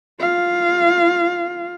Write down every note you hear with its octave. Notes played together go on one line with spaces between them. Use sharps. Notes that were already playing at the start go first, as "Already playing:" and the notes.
F4 F5